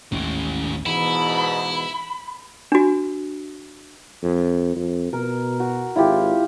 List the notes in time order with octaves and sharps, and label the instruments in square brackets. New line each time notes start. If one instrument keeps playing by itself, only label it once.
[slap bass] G#1 D#2 D#3 [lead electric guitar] A2 C#4
[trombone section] E2 G#2 B2 [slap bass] E3 [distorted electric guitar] E4 [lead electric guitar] B5
[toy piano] D4 F#4
[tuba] F2
F2
[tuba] B2 [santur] A#4
[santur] F#4
[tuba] G#1 [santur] E4 F4 G4